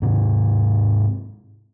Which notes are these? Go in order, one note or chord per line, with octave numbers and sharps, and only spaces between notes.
G#2 C3